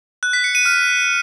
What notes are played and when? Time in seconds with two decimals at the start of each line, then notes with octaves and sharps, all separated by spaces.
0.23 F#6
0.33 B6
0.44 C#7
0.55 D#7
0.65 F6